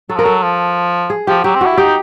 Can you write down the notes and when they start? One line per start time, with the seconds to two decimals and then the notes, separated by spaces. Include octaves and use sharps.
0.09 F#3 A4
0.16 F3 A#4
0.24 F#3 A4
0.43 F3
1.10 G#4
1.27 F3 G4
1.44 F#3 G4
1.55 C4
1.61 E4 F#4
1.77 D#4 G4